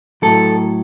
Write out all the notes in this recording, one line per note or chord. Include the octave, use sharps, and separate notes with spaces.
A2 F#3 A4